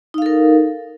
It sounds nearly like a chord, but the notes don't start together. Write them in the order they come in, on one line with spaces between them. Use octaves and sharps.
D#4 F5 A4 A#4